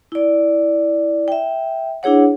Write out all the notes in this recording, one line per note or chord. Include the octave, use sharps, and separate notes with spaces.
E4 D5
E5 G5
D4 E4 G#4 C#5 F#5